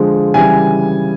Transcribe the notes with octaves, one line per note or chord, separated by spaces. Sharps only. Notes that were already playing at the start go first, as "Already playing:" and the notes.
Already playing: D3 F3 G#3
C#3 E3 G3 G#5